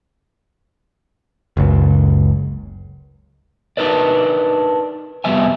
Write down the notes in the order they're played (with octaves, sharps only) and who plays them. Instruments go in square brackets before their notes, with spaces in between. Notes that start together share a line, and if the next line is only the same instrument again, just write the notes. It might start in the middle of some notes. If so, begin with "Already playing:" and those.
[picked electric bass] F#1 C#2
[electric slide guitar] D4 D#4 A#4 B4 D5
F2 C3 G3 B3 E5 G#5